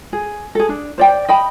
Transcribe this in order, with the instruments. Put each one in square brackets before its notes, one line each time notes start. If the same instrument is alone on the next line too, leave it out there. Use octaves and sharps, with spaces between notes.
[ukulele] G#4
G#4 A4
D4
C5 D5 G5
D#5 G5 B5